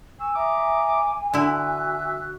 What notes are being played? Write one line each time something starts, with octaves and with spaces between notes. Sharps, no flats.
G#5 C#6 E6
E5 A#5 D6 D#6
D3 E4 F#4 E5 F#6